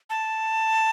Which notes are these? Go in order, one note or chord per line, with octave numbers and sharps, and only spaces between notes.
A5